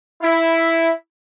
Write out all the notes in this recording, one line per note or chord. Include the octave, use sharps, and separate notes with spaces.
E4